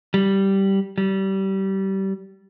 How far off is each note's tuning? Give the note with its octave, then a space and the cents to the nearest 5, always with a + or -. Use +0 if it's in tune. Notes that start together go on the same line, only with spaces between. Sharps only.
G3 -10
G3 -25